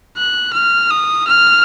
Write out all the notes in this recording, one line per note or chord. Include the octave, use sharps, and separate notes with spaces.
F#6
F6
D#6
F6